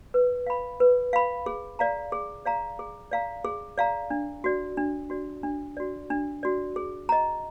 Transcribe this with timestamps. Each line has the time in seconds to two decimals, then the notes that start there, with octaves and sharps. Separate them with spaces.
0.14 B4
0.47 F5 B5
0.80 B4
1.13 F5 B5
1.46 G#4
1.79 D5 F5 A#5
2.12 G#4
2.46 D5 F5 A#5
2.79 G#4
3.11 D5 F5 A#5
3.45 G#4
3.78 D5 F5 A#5
4.10 D4
4.44 F#4 D5
4.77 D4
5.10 F#4 D5
5.43 D4
5.77 F#4 D5
6.10 D4
6.43 F#4 D5
6.76 G#4
7.09 D#5 A#5